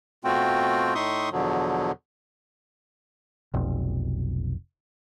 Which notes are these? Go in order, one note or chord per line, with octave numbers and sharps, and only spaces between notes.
B2 A3 C4 F4 F#4 G5
A2 D#4 E5 C6 C#6 D#6
E2 B2 D3 F3 F#3
F1 B1